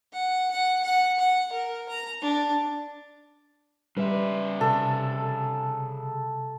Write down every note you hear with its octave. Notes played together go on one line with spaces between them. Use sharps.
F#5
F#5
F#5
F#5
A#4
A#5
D4
C#3 G3 B4 E5
C3 A4